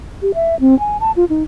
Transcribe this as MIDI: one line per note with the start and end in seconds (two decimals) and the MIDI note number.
0.22 0.32 67
0.34 0.58 76
0.60 0.78 60
0.79 0.97 80
1.00 1.12 81
1.16 1.25 65
1.29 1.43 63